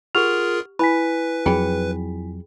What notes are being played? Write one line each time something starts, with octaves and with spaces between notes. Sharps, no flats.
F4 G4 G#4 A#4 F#5 F6 F7
E4 B4 G#5 B5 B6
F2 F#3 G#4 G5 B5